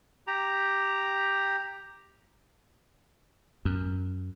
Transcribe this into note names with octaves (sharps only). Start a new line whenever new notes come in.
G4 A#5
F#2